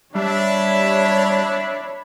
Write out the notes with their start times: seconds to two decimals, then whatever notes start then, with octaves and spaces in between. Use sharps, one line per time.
0.15 G3 D4 C#5 E5 B5